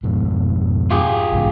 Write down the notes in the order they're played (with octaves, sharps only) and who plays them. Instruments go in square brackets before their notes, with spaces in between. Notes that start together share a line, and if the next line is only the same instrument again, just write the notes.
[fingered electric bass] F2 G#2 B2
[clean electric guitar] F4 G4 G#4
[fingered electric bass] B1 G#2 C#3